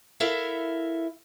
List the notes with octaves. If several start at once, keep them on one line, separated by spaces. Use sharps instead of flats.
E4 A4 A#4 E5 F5